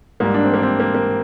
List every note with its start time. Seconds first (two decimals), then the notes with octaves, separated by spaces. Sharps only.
0.20 G#2 G3 A#3
0.34 D4
0.44 C4
0.54 A#3
0.63 C4
0.80 A#3
0.94 A#3